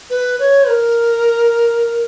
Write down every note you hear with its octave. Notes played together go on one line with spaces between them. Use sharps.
B4
C#5
A#4